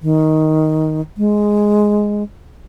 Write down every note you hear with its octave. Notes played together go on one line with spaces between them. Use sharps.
D#3
G#3